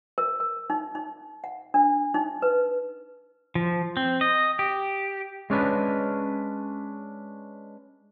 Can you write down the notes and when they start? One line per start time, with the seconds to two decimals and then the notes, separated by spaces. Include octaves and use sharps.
0.18 A#4
0.40 A#4
0.70 D#4
0.95 D#4
1.44 F#5
1.74 D4
2.14 D#4
2.42 B4
3.55 F3
3.97 C4
4.21 D#5
4.59 G4
5.50 G#3 C#4 D4 B4